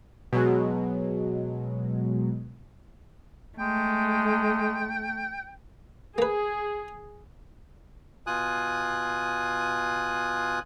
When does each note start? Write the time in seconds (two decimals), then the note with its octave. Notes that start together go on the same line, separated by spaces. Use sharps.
0.33 B2 F#3 G#3
3.59 G#3 A3 G5
6.18 A#3 G#4 B4
8.27 B2 F4 G#5 D#6 F#6